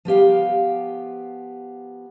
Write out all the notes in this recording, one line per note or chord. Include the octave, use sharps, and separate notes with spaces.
F3 B3 G4 F5